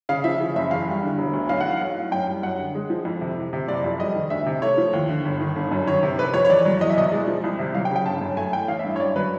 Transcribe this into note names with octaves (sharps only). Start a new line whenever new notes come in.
C#3 F5
F3 E5
C#3
F#1 E5
E2 F5
G3
D3
E1
D2
B1 F5
E3 F#5
F5
B1
A2
F#2 G5
G3
F#2 F#5
D3
G#3
F3
F2
C3
E3
C3
F#1 D5
F2
G3 D#5
D#3
D2 E5
C3
A3 C#5
F3
D#2
D3
G1
D#3
G1
F#2
D#3 C#5
C3
F1 B4
F2 C#5
C#5
E2 D5
F#3
E2 D#5
E5
B2 D#5
G#3 D5
F3
C2
C3
F#3 F5
G5
C#3
G5
G1 A5
F#2
A3 G#5
E3 G5
A1 F5
E5
G2
C#5
F#2 D5
F#3 B4